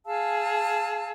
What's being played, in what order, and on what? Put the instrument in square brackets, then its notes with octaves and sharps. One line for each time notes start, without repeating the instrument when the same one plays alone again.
[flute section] G#4 F5 A5 E6